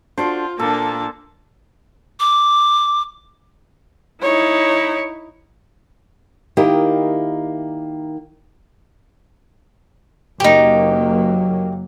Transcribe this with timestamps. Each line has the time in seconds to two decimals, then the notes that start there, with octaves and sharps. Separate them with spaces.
0.18 D4 F4 F#4 A4 C5
0.60 A#2 A#3 D4 A4 A5
2.20 D6
4.23 D#4 E4 C#5
6.57 D#3 A#3 E4 G4 D#5
10.40 F#1 F#3 A#3 D#4 G4